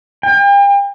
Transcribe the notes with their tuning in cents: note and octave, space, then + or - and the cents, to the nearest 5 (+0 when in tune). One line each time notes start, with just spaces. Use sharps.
G5 +40